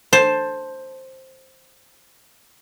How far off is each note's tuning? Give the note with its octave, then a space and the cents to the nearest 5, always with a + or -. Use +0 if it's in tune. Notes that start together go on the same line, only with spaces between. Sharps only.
C5 +10 A5 +0